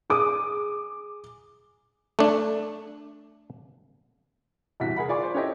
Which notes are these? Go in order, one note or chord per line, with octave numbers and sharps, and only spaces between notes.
G#4 D6 D#6
A3 D4
G1 E2 C3 E3 F#4 B6
G#4 A#4 F#5 B5
F4 D5 G#5 C#6 D6
C5
C#4 E4 G4 A4 C#5 D#5